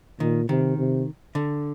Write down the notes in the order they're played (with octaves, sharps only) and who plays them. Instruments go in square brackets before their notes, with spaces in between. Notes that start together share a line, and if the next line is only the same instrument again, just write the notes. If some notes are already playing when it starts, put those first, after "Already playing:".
[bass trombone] A#2 [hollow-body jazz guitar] D#3
[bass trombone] C3 [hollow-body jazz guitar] D#3
[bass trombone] C3
[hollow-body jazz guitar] D3